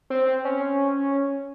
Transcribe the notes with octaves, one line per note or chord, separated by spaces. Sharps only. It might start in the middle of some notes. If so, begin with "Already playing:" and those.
C4
C#4